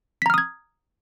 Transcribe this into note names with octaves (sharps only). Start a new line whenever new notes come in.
A#5 D#6 F6 G#6 B6